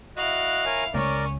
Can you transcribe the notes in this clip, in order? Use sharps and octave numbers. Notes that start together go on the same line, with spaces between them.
E4 F#4 D#5 F5 F#6
A#4 C#5 G#5
C#2 C#4 A#4 C#5 D5